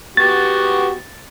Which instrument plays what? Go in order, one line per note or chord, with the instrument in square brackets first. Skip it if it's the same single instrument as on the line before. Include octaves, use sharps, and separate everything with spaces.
[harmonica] B3 F#4 G4 [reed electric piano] A6